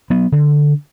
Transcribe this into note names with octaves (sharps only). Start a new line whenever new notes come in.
F#3 B3
D3